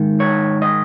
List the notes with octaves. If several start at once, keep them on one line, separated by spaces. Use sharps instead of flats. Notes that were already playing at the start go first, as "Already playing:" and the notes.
Already playing: G#2 D#3
C#5
D#5